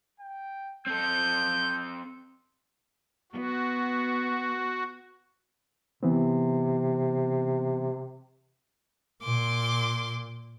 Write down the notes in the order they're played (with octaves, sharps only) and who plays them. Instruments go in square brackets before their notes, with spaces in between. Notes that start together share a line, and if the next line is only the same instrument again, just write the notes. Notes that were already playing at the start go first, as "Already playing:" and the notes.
[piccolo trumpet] G5
[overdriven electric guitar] C4 A4 [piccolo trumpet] G6
[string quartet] B3 [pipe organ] F#4
[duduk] C3 [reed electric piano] E3 B3 C4
[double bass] A#2 [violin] C6 D6